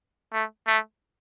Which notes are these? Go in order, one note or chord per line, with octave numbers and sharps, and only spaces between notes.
A3
A3